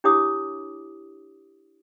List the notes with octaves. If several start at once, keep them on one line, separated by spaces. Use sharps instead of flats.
D4 E4 G4 C#5 D6 D#6